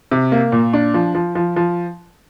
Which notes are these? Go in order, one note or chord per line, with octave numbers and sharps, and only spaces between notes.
C3
A#3
A#2
D4
F3
F3
F3
F3